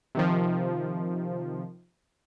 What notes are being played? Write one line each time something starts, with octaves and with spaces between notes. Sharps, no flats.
C3 D#3 F3